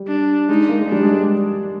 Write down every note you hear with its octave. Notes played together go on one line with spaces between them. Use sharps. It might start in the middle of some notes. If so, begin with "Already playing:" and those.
Already playing: G3
D4
G#3 D#4
A#3
G#3
G3 D4
G#3